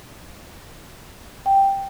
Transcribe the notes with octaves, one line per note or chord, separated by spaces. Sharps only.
G5